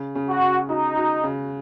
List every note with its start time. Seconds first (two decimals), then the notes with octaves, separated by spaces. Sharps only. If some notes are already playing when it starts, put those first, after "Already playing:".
Already playing: C#3
0.15 C#3
0.28 F#4
0.41 C#3
0.68 D#4 F#4
0.96 F#4
1.24 C#3